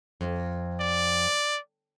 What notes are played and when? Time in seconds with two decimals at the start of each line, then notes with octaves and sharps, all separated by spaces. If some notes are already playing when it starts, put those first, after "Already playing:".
0.21 F2
0.80 D5